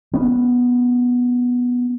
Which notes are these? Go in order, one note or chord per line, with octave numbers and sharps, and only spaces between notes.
B3 C#4